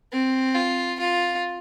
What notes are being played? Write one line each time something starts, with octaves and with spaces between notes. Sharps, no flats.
C4
F4
F4